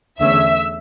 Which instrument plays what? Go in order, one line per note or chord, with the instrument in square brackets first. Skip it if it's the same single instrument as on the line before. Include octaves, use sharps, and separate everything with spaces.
[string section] E2 D3 A3 C#4 E5 E6